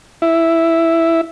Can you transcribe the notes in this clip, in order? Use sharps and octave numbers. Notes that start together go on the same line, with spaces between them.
E4 E5